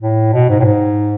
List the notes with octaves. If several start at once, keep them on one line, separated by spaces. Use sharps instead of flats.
A2
B2
G#2
A2
G#2